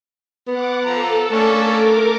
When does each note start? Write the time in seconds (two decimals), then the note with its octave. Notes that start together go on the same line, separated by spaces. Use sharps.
0.47 B3 F#5 D6
0.84 F3 A4 A#5
1.32 A3 A#3 C#4 D4
1.63 A#4 D6